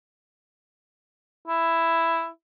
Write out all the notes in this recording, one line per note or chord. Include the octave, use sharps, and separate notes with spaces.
E4